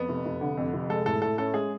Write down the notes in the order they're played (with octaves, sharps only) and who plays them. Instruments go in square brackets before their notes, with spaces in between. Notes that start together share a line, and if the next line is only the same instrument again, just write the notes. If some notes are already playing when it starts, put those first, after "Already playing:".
Already playing: [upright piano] F2 [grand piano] B3
[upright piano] F1
F1
D3
F2
F1
[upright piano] G#3 [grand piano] A4
[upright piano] A2 [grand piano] A4
[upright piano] A2 [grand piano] A4
[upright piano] C#4 [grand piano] A4
[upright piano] G#3 [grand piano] G#4